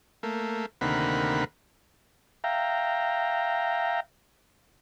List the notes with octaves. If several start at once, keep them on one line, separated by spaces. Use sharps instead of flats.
A3 A#3
D2 C3 D#3 A#3 F#5 B5
E5 F5 G5 A#5